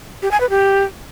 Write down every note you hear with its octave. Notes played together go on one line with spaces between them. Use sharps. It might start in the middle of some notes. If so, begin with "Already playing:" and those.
G4
G#5
B4
G4